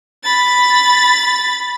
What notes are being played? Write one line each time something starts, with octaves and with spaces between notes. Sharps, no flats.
B5 A6